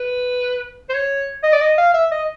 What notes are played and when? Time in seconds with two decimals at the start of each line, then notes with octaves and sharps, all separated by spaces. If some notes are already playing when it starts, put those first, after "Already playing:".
Already playing: B4
0.90 C5
0.94 C#5
1.43 D#5
1.53 D5
1.61 D#5
1.78 F5
1.94 E5
2.11 D#5